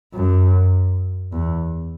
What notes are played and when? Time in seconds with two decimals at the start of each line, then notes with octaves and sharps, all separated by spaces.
0.14 F#2
1.32 E2